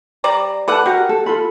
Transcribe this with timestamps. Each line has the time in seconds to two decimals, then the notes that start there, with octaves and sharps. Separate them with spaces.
0.24 G3 D5 A#5
0.68 A4 B4 D5 F#5 A5
0.86 F#4 G4 A#4 F#5
1.09 A4
1.26 F4 A4 B5